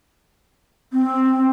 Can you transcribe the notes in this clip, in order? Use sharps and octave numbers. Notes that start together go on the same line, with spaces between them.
C4